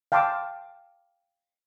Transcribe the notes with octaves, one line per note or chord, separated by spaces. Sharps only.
F5 G5 A5 C6 D6 E6